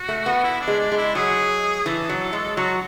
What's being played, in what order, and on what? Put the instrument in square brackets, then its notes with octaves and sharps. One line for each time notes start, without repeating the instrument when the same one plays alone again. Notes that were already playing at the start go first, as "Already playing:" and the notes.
Already playing: [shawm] F#4
[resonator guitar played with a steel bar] A3
B3
[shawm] E4
D4
[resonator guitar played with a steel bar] G#3
[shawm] D4
[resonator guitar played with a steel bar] G#3
[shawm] E4
[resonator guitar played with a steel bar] F#3 [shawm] G#4
[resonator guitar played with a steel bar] E3 [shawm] A4
[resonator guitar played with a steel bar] F#3
G#3
[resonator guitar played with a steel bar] F#3 [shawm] F#4